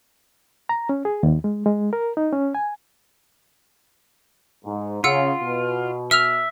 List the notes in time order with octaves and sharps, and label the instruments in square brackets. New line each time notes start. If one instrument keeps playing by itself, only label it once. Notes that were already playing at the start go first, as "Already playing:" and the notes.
[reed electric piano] A#5
C#4
G#4
D#2
G#3
G#3
A#4
D#4
C#4
G#5
[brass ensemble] G#2
[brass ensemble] C#3 [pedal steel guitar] F4 [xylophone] F#5 E6 C#7
[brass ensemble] B2
[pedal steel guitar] E5 [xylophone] E6 F6 F7